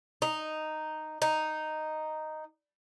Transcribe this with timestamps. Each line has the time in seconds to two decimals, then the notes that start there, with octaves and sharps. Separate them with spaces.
0.22 D#4
1.22 D#4